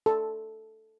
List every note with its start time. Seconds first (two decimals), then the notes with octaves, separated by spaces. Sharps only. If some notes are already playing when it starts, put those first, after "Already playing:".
0.06 A4